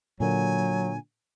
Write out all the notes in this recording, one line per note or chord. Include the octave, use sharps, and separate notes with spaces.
A#2 D3 F#3 A#3 G#5